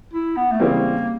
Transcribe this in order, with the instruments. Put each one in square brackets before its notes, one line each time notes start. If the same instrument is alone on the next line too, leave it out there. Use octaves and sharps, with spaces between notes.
[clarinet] E4
B3
A3
[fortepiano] C#3 E3 G3 C4 [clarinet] A#3